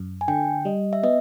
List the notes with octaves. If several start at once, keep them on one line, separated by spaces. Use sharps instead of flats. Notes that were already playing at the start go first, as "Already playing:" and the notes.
Already playing: F#2
G#5
D3 G5
G3 D#5
E5
B3 D#5